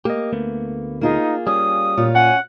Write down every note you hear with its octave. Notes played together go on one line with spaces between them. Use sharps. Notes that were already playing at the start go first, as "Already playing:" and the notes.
A#3 G4 D#5
D2 A3 B3
A#3 D#4 F4 G#4
G3 C#4 D#6
A#2 F4 C#5
C#4 F#5 G#5